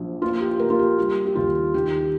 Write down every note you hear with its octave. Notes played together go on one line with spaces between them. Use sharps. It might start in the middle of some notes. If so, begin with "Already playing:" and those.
Already playing: A#1 F3
A#3 F4
G4
A#3 A#4
F4
G4
G3 G4
G4
D#2 F4
D#3 G4